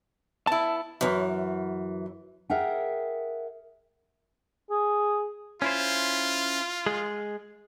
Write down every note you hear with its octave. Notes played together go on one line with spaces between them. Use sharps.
B3 E4 A5
F#2 E3
G#4 A#4 E5 F#5 G5
G#4
C#4 E4 F4 C5
G#3 G#4